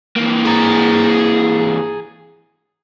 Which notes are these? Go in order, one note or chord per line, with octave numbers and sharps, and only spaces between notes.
E3 A#3
G#4 A#5